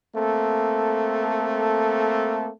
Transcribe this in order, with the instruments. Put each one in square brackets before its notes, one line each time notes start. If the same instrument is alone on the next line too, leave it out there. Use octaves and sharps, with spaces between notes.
[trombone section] A3 A#3 C4 A4